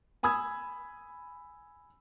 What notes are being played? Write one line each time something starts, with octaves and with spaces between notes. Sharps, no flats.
G#5 B5 D#6 E6 G#6